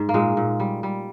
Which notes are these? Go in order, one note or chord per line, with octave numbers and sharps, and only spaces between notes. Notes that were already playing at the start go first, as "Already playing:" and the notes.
Already playing: G#2
A#3
A#2 G#3
A#2
G3
G3